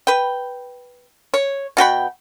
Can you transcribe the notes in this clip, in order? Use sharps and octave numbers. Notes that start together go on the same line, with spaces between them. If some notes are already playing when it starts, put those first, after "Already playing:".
B4 G5
C#5
B2 F#4 G5 B5